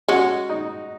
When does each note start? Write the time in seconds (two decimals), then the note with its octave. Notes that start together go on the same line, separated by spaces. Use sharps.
0.08 G#3 C#4 F#4
0.49 D#4